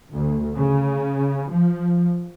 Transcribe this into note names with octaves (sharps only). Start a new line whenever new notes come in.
D2
C#3
F3